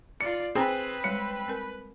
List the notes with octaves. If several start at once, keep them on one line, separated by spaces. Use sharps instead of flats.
F4 D5 C#7
C4 G#4 B4
G3 G#3 C#5 C#7
C4 A#4